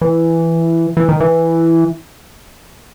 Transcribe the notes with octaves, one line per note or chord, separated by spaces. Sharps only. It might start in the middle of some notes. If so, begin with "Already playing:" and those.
E3
E3
D#3
E3